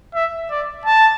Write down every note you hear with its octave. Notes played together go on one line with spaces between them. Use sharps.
E5
D5
A5